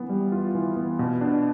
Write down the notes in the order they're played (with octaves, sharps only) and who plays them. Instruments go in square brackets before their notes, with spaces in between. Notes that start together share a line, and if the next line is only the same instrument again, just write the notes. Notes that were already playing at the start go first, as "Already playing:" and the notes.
Already playing: [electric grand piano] E3 B3
G3
F4
E3
B3
B2
D4